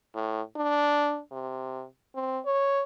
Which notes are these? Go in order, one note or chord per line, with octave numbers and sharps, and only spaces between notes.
A2
D4
C3
C4
C#5